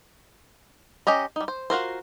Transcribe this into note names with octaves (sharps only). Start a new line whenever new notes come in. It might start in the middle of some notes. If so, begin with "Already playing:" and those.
C#4 G4 D#5 A#5
G3 D#4
C5
F4 F#4 A#4 C5